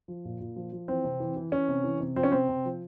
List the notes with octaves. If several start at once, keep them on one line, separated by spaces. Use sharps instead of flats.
F3
A#2
A#2
F3
F3
E3 C4
C3
E3
E3
E3 C#4
C3
E3
C3
F3 C4
C#4
C3 C4
C3
F3